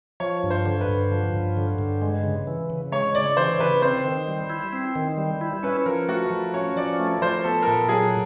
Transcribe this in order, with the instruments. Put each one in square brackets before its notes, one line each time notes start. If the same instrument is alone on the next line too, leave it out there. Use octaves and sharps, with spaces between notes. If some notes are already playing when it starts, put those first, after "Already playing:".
[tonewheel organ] F3 [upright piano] C#5
[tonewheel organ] G2
[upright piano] C5
[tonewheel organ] D3
[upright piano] B4
[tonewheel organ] G2
F3
G2
D3
G2
G#3
C#3
E3
C#3
[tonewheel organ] G#3 [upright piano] C#5
[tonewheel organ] C#3 [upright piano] D5
[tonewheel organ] E3 [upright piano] C5
[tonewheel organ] C#3 [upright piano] B4
[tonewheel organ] C4 [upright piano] C5
[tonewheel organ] D#3
G3
E4
C4
D#3
G3
E4
[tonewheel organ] C#4 [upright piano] B4
[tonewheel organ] F3 [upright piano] A#4
[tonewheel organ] A3 [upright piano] F#4
[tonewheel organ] F3
[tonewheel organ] C#4 [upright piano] C#5
[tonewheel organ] F3 [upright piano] D5
[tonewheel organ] A3
[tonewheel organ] F3 [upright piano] C5
[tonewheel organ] B3 [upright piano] A4
[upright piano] A#4
[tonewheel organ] A#2 [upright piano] A4
[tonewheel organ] F#3 [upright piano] G#4